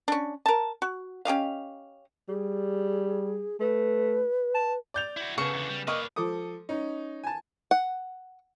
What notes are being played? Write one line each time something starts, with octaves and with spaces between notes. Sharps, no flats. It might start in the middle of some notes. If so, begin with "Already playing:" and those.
C#4 D4
A#4 A5
F#4
C#4 G4 D#5 F5
G3 G#4
A3 B4
A5
D5 G6 F7
E4 F#4
C#3 B3 G#4 A4 C#6
E2 D3
G3
A#3 B4 D5 D#5 C#6 F6
F3 A4 D6 D#6
C#4 D#4
G#5 A5
F#5